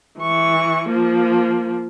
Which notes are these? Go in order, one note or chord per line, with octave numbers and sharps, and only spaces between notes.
E3 C#6
F3 A#3